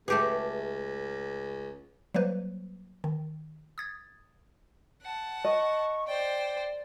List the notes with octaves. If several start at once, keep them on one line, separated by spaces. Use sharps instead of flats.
C#2 A3 G4 G#4 B4 A5
F#3 G3 A#3 B4 C5
D#3
D#6 G#6 A6
F#5 A5
D#5 C#6
C5 D5 G5